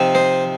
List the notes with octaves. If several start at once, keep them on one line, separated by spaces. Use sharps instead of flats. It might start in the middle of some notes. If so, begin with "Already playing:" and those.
Already playing: C3 F3 C4 D#4
C5 D#5